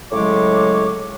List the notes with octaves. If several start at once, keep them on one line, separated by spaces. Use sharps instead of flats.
A2 C#3 F#3 G#3 C#5 D6